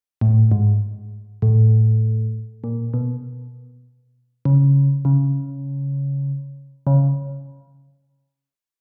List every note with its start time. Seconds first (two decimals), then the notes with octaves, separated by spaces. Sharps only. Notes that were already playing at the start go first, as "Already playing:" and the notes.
0.21 A2
0.52 G#2
1.42 A2
2.64 A#2
2.94 B2
4.45 C#3
5.05 C#3
6.87 C#3